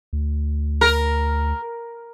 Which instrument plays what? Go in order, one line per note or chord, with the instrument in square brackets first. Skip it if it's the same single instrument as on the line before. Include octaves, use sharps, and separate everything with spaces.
[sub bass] D2
[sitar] A#4